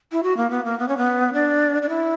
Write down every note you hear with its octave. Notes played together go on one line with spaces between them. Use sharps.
E4
F#4
A#3
B3
A#3
B3
C#4
B3
D4
D4
E4